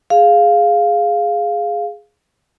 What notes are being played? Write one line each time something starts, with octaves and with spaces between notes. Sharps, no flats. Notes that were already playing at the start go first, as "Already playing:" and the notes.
G#4 F5